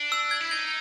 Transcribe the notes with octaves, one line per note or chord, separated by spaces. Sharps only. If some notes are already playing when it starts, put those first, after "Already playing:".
Already playing: D4
E6
G#6
E4
D#4 G#6